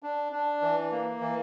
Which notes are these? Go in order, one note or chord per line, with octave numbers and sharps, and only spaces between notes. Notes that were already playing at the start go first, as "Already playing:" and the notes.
D4
D4
E3
A#3
E3